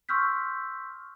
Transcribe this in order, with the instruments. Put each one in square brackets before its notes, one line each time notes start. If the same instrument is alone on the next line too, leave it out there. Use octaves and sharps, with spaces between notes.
[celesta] C6 C#6 E6 F6 G6 B6